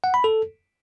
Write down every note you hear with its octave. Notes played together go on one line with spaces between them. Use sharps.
F#5
B5
A4